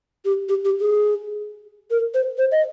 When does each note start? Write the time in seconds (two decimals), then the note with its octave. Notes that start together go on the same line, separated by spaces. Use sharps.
0.25 G4
0.49 G4
0.65 G4
0.80 G#4
1.91 A#4
2.14 C5
2.38 C5
2.51 D#5